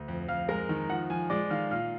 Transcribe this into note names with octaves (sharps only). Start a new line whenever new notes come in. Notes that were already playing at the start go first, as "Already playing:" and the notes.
Already playing: D2
F2
F2 F5 F6
G#3 A#4 A#5
D#3
F3 F#5
F3 G#5
G#3 D5 D6
D#3 F5 F6
A#2 F5 F6